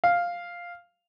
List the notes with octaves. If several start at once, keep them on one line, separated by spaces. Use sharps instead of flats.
F5